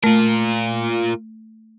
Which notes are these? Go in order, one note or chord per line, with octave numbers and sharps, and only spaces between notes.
A3 F4 A#4